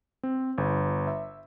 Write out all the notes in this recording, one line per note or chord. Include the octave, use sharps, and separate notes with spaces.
C4
G1
E5